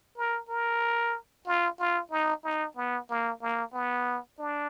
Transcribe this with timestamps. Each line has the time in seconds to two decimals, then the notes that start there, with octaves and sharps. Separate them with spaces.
0.17 A#4
0.49 A#4
1.46 F4
1.79 F4
2.11 D#4
2.44 D#4
2.76 B3
3.09 A#3
3.41 A#3
3.73 B3
4.39 D4